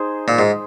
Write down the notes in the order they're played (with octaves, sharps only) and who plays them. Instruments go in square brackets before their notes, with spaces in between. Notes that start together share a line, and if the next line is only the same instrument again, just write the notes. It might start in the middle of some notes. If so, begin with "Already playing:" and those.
Already playing: [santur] D#4 G#4 C5
[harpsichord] A#2
G#2